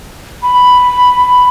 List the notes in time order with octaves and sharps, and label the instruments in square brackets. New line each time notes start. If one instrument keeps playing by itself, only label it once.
[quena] B5